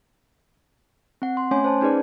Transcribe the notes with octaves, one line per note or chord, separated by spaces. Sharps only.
C4 F#5
C6
A3 C#4 C#5 G#5 C6
C5 A5
C#4 D#4 G#4 B4 D5